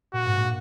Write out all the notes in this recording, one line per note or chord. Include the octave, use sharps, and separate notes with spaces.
A#2 F#4
G#2
A#2